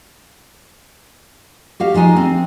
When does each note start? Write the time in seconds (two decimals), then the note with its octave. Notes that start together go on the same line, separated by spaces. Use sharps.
1.80 F#4 G4 F5
1.94 F3 G#3 D#4 G#5
2.16 C4